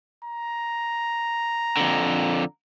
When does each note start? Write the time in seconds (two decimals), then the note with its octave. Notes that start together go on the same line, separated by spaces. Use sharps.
0.25 A#5
1.77 F2 D3